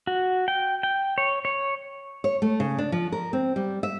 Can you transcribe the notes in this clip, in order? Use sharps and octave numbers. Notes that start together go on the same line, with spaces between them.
F#4
G5
G5
C#5
C#5
C#5
A3
C#3
D4
F3
A#4
C4
G3
E5